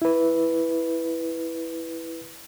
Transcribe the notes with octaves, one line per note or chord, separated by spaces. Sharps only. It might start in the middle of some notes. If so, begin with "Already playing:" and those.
E4 B4